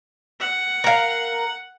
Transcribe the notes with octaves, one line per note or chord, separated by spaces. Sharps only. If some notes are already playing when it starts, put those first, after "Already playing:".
F#5
A#4 F5